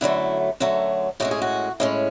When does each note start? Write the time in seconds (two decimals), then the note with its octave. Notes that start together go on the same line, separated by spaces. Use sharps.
0.01 F#2 D3 F#3 A3 E4
0.60 F#2 D3 F#3 A3
1.20 A2 G#3 C#4 F#4
1.31 G#4
1.42 F#4
1.80 A2 G#3 C#4